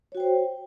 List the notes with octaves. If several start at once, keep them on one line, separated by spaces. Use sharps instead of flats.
F#4 C5 C#5 G5